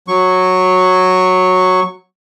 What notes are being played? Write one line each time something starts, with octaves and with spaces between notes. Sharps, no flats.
F#3 C#6